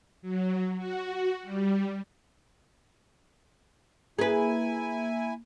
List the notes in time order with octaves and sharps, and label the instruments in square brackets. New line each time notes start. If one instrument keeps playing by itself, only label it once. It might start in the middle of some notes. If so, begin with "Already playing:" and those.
[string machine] F#3
F#4
G3
[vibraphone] A#3 [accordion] E4 G#5 [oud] G#4 B4